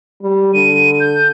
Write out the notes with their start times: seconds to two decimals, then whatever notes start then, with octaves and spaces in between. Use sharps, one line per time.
0.22 G3
0.54 D3 D#7
1.00 G6